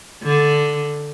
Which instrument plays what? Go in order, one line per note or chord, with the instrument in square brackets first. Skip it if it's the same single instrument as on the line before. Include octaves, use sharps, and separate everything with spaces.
[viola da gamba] D3